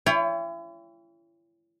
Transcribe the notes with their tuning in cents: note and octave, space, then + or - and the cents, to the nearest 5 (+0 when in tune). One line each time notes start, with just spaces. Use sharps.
E4 +40 C#5 +30 G5 +35